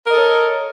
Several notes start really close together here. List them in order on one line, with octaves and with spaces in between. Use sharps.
A#4 D#5 A4 C#5